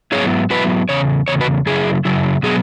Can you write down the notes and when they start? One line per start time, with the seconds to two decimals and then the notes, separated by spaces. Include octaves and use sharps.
0.12 G#2 F#3 B3 E4 G#4 C#5
0.50 G#2 F#3 B3 E4 F#4 B4
0.89 E2 C#3 C#5
1.28 E2 C#3 C#5
1.41 F#4 B4
1.66 F#2 C#3 F#3 E4 G#4
2.05 F#2 C#3 F#3 E4
2.43 B2 F#3 B3 G#4